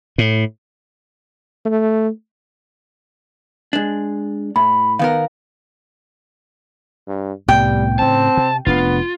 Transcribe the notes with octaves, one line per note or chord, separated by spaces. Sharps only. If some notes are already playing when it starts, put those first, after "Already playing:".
A2
A3
G#3 D4
A2 B5
D#3 B3 A#4 F5
G2
C2 A2 G3 B3 G5
A2 C#3 C4 A5
C3
F1 B3 D4 F4